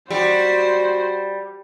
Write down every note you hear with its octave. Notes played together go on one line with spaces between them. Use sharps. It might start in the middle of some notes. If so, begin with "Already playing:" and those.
G3 F#4 C5